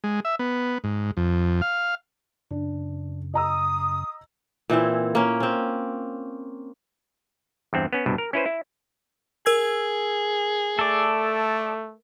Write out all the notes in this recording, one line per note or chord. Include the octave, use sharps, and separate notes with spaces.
G#3
E5
B3
G#2
F2
F5
F#2 C#3 D4
D#5 A#5 D#6 E6
A#2 E3 C4 E4
A#3 C#4
C4 C#4
E2 G2 C4
B3 C#4
C2 G2 B2
A#4
C#4 E4 B4 C5
E4
G#4 A#4 E6 G#6
A3 A4 D5